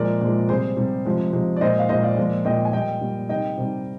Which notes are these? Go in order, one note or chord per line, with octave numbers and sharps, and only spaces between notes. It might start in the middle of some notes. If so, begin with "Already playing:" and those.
Already playing: A#2 F3 G#3 A#4 D5
A#2 F3 G#3
C3 G3 G#4 C5
C3 G3
C3 F3 G#3
C3 F3 G#3
D5
A#2 G#3 C5 D#5
F5
A#2 G#3 C5 D#5
D5 F5
A#2 F3 G#3
A#2 F3 G#3 D#5 G5
G#5
A#2 G3 D#5 G5
A#2 G3
C3 D#3 G3 D#5 G5
C3 D#3 G3